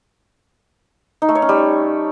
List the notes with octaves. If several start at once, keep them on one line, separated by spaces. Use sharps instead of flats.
D#4
A3
C#5
C#4
G3